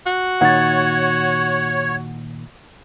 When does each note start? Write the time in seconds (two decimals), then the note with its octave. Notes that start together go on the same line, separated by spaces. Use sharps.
0.06 F#4
0.41 A#2 D#3 C#5 F#5 A6